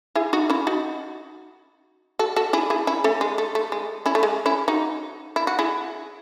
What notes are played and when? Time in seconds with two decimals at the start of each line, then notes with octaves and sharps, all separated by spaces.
0.15 E4 G#4
0.33 D#4 F#4
0.50 C#4 E4
0.67 D#4 F#4
2.19 F#4 A4
2.36 F#4 A4
2.53 E4 G#4
2.70 E4 G#4
2.87 C#4 E4
3.04 A3 C#4
3.21 G#3
3.38 A3
3.55 A3
3.72 G#3
4.06 C#4 E4
4.15 A3
4.23 G#3
4.46 C#4 E4
4.68 D#4 F#4
5.36 E4
5.47 F#4
5.59 E4 G#4